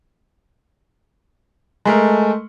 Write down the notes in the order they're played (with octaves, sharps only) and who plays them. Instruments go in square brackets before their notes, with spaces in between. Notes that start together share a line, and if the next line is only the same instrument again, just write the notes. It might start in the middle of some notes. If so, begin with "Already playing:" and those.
[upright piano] G#3 A3 A#4